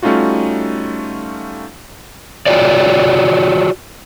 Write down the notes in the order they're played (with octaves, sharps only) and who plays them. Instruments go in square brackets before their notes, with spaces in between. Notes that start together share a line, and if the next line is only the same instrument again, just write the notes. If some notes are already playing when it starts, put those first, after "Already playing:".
[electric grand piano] G3 A3 C#4 D#4 F4 F#4
[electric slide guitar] F4 F#4 G#4 C#5 D5